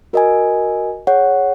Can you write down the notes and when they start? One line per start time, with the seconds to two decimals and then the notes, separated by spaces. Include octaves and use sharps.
0.13 F#4 A#4 D#5 G#5
1.07 G#4 C#5 F#5